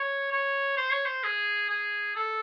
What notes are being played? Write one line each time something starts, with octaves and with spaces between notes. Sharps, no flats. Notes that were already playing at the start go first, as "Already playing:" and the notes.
Already playing: C#5
C#5
C5
C#5
C5
G#4
G#4
A4